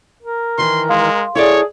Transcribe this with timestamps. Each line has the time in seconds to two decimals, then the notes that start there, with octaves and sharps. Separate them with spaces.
0.23 A#4
0.58 D#3 E3 C6
0.89 G#3 F5 C6
1.35 E4 G#4 A4 C#5 D5